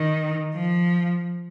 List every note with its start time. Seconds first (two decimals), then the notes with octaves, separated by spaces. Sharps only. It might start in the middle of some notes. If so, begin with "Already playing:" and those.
Already playing: D#3
0.55 F3